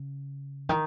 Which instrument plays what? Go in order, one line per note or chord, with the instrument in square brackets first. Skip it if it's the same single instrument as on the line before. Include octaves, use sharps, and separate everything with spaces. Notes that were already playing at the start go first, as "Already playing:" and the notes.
Already playing: [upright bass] C#3
D#3